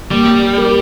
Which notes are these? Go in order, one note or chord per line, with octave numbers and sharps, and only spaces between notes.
G3 A#3
A#4